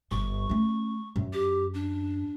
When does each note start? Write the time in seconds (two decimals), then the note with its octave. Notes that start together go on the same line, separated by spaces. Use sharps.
0.11 G1 C#6
0.49 A3 C#4
1.16 F#2
1.33 G4
1.74 D4